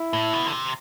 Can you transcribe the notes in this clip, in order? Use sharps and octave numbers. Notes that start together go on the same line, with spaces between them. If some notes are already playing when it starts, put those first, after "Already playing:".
Already playing: E4
A2
B2
D3
C3